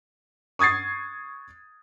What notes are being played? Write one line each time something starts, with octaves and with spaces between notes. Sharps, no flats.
C#6 D#6 G#6 A6 C7